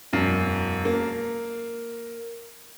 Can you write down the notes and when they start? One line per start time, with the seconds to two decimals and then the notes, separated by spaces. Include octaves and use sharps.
0.13 E1 F#2
0.85 A#3